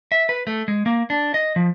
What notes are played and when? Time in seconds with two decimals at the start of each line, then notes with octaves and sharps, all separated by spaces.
0.12 E5
0.29 B4
0.47 A3
0.68 G#3
0.86 A#3
1.10 D4
1.34 D#5
1.56 F3